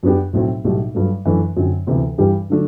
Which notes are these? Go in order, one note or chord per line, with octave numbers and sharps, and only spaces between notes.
F#2 F#3 B3 D4 G4
B1 A2 F#3 C4 F#4
B1 A2 G3
G2 F#3 A3
F#2 E3 A3 D4
F#2 D3 F#3 C4
D2 C3 E3 B3
G2 E3 G3 D4 G4
D3 F#3 A3 D4